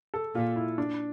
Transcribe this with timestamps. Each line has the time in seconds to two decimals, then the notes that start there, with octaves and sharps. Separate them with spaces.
0.14 A4
0.35 A#2 F4
0.56 E4
0.78 D4